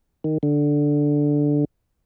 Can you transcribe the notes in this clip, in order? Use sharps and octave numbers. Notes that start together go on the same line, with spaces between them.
D#3
D3